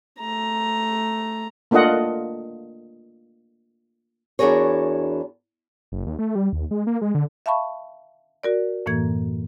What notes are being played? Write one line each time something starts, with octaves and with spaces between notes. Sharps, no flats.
A3 A#5
A3 A#3 D4 F4 D#5 F#5
E2 D4 F#4 G#4 A#4 C#5
F#1
D#2
A3
G3
D#2
G#3
A#3
G#3
D3
E5 F5 A5 B5 C#6
F#4 A#4 D5
F#2 A2 E3 A#3 G#6